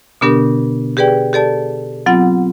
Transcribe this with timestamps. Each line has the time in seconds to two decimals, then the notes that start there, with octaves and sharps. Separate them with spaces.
0.21 B2 D3 B3 D4 G4 A#4
0.97 G4 G#4 B4 D5 G5
1.33 G4 A4 D5 A5
2.06 F#3 B3 C4 F4 F#5